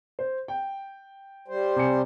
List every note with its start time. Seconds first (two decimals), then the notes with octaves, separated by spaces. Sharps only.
0.19 C5
0.48 G5
1.48 G3 C5
1.76 C3 G#5 C#7